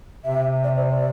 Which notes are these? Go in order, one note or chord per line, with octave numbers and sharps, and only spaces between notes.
C3 E5
D5
C5
D5